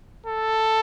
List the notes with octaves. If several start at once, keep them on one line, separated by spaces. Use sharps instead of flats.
A4